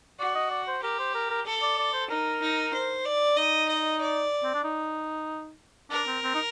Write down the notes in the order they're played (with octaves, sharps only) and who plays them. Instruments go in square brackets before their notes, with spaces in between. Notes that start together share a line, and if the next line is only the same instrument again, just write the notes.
[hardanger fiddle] F#4 [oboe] D5
[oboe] D#5
D5
C5
[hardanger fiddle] G4 [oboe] A#4
[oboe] C5
A#4
A#4
[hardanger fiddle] A4
[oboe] D5
D5
C5
[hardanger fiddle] D#4 [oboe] A#4
[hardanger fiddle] D#4
C5
D5
[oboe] D#4 [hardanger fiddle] D#5
[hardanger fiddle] D#5
D5
[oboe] C4
D4
D#4
[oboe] D4 [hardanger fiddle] A#4
[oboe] C4
C4
D#4